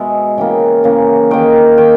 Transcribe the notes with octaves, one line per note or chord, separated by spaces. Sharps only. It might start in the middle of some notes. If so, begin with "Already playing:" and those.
Already playing: B2 G#3 B3 E5
C#3 E3 A#3 G5
C#3 E3 A#3
D#3 A#3 G5
D#3 A#3 G5